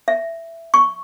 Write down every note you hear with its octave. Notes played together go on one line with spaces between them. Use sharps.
E5
C#6